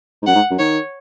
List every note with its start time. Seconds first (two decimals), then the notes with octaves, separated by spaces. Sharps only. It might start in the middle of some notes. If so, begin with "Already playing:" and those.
0.22 G#2
0.27 F#2 F#5
0.35 G#2
0.51 F#2
0.59 D#3 C#5